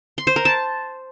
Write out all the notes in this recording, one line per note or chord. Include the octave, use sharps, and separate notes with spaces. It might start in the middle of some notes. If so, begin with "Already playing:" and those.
C6
C5
A#4
A5